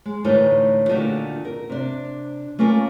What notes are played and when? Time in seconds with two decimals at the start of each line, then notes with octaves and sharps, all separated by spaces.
0.06 G#3
0.24 D2 A2 E3 D#4 A4 A#4
0.89 A#2 D3 D#3 A3 F#4 G4
1.45 A#4
1.70 C3 D4
2.59 A3 A#3 C#4 F4 A#4